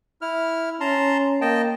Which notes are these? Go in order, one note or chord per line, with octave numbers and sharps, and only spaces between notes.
E4 F6
C#4 A5 A#5 C6
A#3 D#5 G5 A5